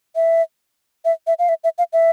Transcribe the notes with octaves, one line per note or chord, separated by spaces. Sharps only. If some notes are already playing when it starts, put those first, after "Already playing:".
E5
E5
E5
F5
E5
E5
F5
E5